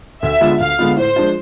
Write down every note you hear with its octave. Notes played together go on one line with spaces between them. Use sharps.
D2 E5
D3 G#3 B3 F4
D2 F5
D3 G#3 B3 F4
A2 C5
F3 G#3 D4 F4